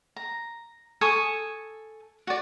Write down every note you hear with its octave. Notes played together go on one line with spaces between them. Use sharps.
A#5
A4 G#5 C#6 D#6
F#4 D5